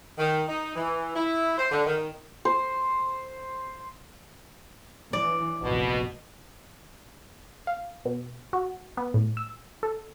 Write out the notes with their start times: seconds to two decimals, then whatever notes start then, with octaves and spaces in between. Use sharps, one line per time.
0.18 D#3
0.48 D#4
0.76 E3
1.16 E4
1.58 C5
1.72 D3
1.86 D#3
2.45 C5
5.13 E3 D5
5.62 F1 A#1 B2
7.67 F5
8.05 B2
8.53 F#4
8.97 B3
9.14 A2
9.37 E6
9.83 A4